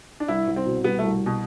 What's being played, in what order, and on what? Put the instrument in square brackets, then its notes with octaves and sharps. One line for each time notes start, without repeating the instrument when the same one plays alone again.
[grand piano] D4
[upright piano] C2 [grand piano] E4
[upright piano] C2
[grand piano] C4
[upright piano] B2
[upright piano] G3 [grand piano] B3
[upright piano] C2 [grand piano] A3
[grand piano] B2